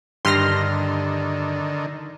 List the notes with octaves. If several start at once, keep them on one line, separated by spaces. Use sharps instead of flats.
G2 D3 D#3 C6 F6 A#6